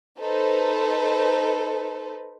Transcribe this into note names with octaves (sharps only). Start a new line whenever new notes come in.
D#4 A4 B4 C5